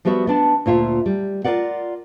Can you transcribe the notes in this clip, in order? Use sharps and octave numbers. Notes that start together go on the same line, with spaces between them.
F3 G3 B3 F#4 E5
B3 D4 A5
D2 A#2 F4 E5
G3
F4 A4 A#4 D5 F#5